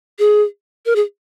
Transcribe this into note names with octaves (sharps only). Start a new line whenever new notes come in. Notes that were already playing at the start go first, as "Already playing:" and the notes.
G#4
A#4
G#4